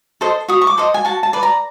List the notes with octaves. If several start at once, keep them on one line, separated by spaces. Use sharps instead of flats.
A4 C5 D#5
F#4 D#6
C#6
D6
A4 C5 D#5
G#5
F#4 A5
A5
B4 D5
A#5